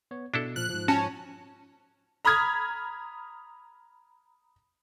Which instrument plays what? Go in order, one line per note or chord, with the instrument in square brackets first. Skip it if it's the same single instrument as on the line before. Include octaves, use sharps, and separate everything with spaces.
[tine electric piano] B3 C#5
[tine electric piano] B2 [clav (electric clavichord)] D4 E4 A4
[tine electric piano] A#2 F3 F6 [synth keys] F#6
[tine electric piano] G#2 F3
[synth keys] C#4 [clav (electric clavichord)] F#4 [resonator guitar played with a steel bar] A5
[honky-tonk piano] A#5 B5 D#6 F6 G#6